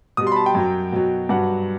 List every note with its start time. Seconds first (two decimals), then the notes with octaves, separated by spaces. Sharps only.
0.17 B2 G3 D#6
0.27 C6
0.32 B5
0.36 A5
0.46 G5
0.55 F#2 F#3
0.92 B2 F#3
1.29 G2 F#3 F#5